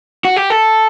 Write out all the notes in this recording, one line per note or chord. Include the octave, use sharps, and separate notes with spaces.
F#4
G4
A4